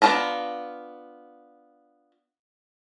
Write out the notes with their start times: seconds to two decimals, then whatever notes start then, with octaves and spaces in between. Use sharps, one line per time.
0.02 B3 D4 F4 A5 A#5